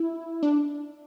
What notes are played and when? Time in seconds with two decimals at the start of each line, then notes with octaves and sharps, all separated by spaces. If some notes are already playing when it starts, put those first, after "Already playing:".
Already playing: E4
0.43 D4